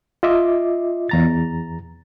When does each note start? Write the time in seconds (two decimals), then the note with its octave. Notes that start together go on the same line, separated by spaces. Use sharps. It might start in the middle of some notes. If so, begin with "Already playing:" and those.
0.23 F4 D#5 E5 D6
1.09 E2 A#5 A6